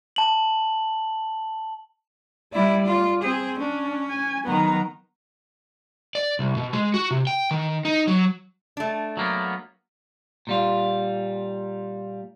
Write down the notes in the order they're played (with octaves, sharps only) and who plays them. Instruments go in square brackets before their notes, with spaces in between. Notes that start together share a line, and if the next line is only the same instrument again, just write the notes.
[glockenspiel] A5 F#7
[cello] G3 E4 [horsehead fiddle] D5
[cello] F4
[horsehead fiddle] C4 [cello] G#4
[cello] C#4 [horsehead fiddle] D4
[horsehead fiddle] G#5
[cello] D#3 F#3 [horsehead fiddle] B3 A#5
[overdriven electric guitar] D5
C2
B2
G#3
F#4
C3
G5
D#3
D#4
F#3
[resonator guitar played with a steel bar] A3 D4
[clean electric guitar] F#3 A#3 B3
A#2 G3 F4